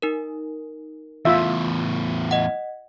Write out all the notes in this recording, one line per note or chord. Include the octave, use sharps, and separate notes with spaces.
D#4 A#4
E2 A2 F4 E5
D#5 F#5